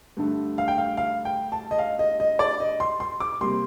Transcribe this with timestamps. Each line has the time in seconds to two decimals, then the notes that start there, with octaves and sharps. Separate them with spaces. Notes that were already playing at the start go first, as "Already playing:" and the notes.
0.17 G2 D3 A3
0.58 F5
0.68 G5
0.78 F5
0.97 F5
1.25 G5
1.52 A5
1.71 D#5
1.79 F5
1.99 D#5
2.20 D#5
2.39 D5
2.60 D#5
2.80 C6
3.00 C6
3.20 D6
3.41 C3 G3 A#3 C6